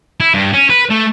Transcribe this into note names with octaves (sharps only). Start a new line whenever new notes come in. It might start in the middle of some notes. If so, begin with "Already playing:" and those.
E4
G2
C#4
B4
A3